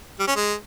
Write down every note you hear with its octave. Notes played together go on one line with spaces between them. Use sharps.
G3
C#4
G#3